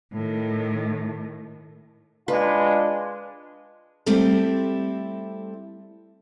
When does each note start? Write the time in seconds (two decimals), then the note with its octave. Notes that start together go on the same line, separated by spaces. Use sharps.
0.12 A2 D#3
2.28 G#3 D4 F4 B4
4.06 G3 A3 C4 E4 G4 A4